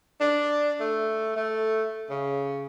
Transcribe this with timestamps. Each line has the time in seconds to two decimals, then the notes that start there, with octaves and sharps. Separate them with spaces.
0.20 D4
0.80 A3
1.36 A3
2.10 C#3